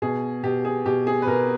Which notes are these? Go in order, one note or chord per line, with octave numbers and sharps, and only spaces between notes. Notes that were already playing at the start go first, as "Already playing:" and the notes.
B2 G#4
B2 G4
G#4
B2 G4
G#4
B4
B2 A#4